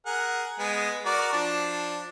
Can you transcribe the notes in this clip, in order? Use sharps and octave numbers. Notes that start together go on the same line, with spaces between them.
G#4 A#4 F#5
G#3 B3 G#4
F#4 A#4 D5
F3 D4